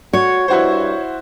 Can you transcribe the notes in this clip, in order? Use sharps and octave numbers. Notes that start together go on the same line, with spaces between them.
F#4 C#5
G2 E4 F#4 C5